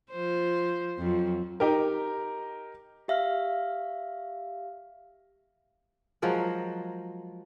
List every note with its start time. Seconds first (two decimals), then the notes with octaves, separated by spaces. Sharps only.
0.11 F3 C5
0.98 F2 F#3
1.60 D#4 G4 A#4
3.08 G4 E5 F5 F6
6.22 F3 F#3 G#3 A#4